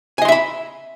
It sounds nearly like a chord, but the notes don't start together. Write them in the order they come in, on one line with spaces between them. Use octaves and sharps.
G#5 D#5 C6 E5 B5